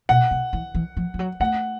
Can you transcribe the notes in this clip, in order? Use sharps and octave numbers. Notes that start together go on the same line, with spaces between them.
B2 F#5
C3
E3
E3
F3
F3
F#3
A3 F#5